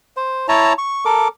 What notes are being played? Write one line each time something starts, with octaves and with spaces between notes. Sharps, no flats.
C5
E4 C#5 A5 A#5
C#6
A4 A#4 D6